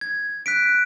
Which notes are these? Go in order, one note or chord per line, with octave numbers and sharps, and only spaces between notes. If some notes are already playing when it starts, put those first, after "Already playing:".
G#6
F#6 B6 D7